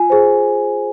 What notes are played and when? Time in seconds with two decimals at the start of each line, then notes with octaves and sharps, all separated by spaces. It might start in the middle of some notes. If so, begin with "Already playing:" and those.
Already playing: F4 G#5
0.10 G#4 C5